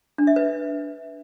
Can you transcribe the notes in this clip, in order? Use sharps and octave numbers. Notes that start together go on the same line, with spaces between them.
D4
E5
B4